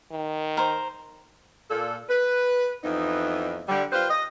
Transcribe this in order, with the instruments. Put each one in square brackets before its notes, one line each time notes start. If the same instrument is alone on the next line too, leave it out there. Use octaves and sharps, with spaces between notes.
[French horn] D#3
[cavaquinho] A#4 C5
[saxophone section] A#2 A4
B4
F2 E3 B3 D#4
D3 G3
F4 G4 B4 C5
D#5